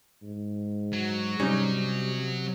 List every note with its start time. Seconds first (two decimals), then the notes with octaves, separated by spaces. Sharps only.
0.23 G#2
0.93 F#3
1.40 C3 G3 C#4 D#4